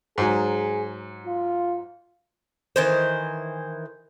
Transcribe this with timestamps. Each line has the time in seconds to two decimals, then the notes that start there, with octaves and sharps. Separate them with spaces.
0.18 G#2 F#3 G#4 G#5
1.26 F4
2.76 D#3 E3 C5